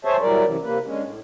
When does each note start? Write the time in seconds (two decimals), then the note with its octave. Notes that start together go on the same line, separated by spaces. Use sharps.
0.05 G#4 C5 C#5 E5 A5
0.21 E3 F#3 G3 A#4 D5
0.45 F#2 C3 E3
0.63 C3 A#3 B4
0.86 D3 G#3 C#4
1.02 A2